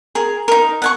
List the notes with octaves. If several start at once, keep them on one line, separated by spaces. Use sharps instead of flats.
G#4 A#4
D#4 A#4
F#5 G#5 C#6